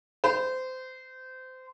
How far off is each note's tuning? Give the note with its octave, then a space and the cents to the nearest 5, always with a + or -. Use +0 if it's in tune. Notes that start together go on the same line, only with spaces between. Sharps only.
C5 -25